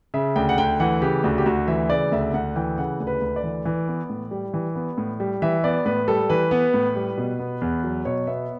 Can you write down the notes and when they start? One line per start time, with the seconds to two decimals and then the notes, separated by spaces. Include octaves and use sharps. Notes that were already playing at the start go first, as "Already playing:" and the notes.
0.14 C#3 E5
0.36 D2 G5
0.49 F#5
0.58 D2 G5
0.80 E3 F#5
1.02 C#3 G4
1.24 D2 F#4
1.38 G4
1.46 D2 F#4
1.68 E3 E5
1.90 C#3 D5
2.12 D2 E5
2.34 D2 F#5
2.56 E3 G5
2.78 C#3 F#5
3.00 D2
3.07 B4
3.22 D2
3.36 D5
3.44 E3
3.65 E3
3.87 B3
4.10 A2
4.31 G3
4.54 E3
4.75 B3
4.98 A2
5.20 G3
5.42 E3 E5
5.64 B3 D5
5.86 A2 B4
6.08 G3 A4
6.29 E3 B4
6.51 B3
6.74 A2
6.96 G3
7.17 B2
7.39 B3
7.61 E2
7.83 F#3
8.05 B2 C#5
8.27 B3 E5